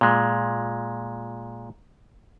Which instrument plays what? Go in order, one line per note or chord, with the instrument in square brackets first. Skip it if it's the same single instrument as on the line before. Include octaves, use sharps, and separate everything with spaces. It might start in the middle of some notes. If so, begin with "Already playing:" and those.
[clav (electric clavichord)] A#2 G#3